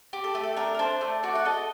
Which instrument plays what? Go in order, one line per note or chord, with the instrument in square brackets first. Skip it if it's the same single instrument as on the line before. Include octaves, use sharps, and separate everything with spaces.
[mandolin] G4
A4
A3
A4
D4 A#4
A#4
D4 C5
A3
F#4 D5
F#5
A4 D#5